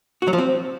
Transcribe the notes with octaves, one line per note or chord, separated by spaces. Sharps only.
F#4
F#3
F3
C4